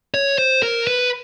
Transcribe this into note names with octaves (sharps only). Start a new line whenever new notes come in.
C#5
C5
A#4
B4